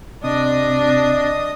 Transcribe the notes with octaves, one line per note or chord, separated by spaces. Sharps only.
C3 D4 D#5 D#6